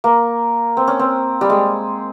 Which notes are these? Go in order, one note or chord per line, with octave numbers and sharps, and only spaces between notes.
A#3
C4
C#4
C4
G3
G#3